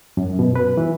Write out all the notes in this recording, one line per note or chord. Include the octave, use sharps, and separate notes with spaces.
F#2
B2
B4
E3